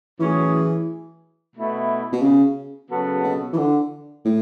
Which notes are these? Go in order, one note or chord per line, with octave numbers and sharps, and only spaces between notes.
A2 E3 F#3 C#4 G#4
B2 A3 E4
B2
C#3
C#3 F#3 B3 F#4 A4
B2
E3
D3
A2